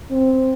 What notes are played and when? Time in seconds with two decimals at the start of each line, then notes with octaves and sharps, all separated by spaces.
0.11 C4